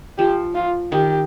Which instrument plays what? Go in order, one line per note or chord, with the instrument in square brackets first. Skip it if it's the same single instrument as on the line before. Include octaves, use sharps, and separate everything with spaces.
[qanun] F3 [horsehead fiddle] G4
[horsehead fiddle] F4
[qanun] D#3 [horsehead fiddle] G4